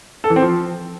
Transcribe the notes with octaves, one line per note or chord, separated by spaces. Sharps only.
A4
E3
C4
F3